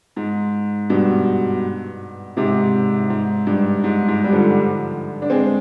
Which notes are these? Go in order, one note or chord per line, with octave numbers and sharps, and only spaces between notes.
G#2
G2 B2
G#2 C3
G#2
G2
G#2
G#2
G3
D3 F3
D4
G#3 C4